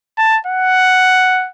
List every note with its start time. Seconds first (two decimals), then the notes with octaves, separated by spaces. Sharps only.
0.18 A5
0.47 F#5